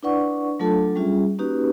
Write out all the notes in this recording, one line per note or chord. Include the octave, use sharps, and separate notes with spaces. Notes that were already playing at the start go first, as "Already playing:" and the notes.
D4 E4 B4 D5 F#5 C#6
F#3 A3 D4 F4 A4 A5
G3 C#4 F4 G#4 E5
A#3 C#4 D#4 F#4 G4 B4